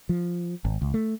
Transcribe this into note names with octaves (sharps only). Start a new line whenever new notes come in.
F3
G#1
C#2
A3